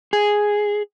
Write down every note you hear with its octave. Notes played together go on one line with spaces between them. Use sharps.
G#4